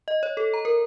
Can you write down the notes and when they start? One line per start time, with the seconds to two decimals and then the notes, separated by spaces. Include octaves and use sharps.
0.08 D#5
0.23 C#5
0.37 A4
0.54 A#5
0.65 A#4